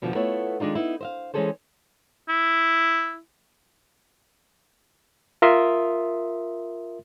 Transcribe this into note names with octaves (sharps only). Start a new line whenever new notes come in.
F2 B2 D3 E3 F3
A3 B3 E4 F4 C#5
D#3 G#3 D4 D#4 F4
B3 D#4 E4
C5 E5 F5
E3 G#3 C#4 G#4 A4 C5
E4
F4 A#4 E5 C6 D#6